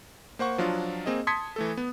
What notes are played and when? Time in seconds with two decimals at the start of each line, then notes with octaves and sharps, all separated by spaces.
0.39 A#3 C5 F#5 C#6
0.58 F3 F#3 D4 F4
1.06 A#3 C4 G#4 D#5
1.27 A5 C6 D#6 G#6 B6 C#7
1.56 E3 A3 A4
1.77 B3